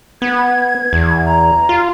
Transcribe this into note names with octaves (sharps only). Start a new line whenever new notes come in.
B3 G#6
E2
A#5
F4